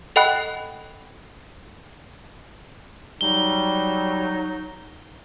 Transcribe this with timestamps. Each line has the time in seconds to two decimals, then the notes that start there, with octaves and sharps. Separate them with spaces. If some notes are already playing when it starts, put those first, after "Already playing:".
0.16 A4 D#5 F#5 G5 B5 F#6
3.21 F#3 G3 D#4 G7